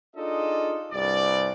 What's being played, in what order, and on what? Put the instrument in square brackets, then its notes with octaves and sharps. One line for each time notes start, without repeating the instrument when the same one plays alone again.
[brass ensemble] D4 D#4 F4 G#4 A4 D#5
C2 G2 D5